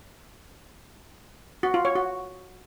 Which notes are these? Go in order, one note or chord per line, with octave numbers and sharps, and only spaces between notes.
F#4
F4
C#5
F#4